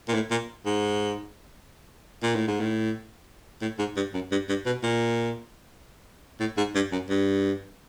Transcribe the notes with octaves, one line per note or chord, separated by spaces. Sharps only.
A#2
A2
A#2
G#2
A#2
A2
G#2
A2
A2
G#2
G2
F#2
G2
G2
B2
A#2
A2
G#2
G2
F#2
G2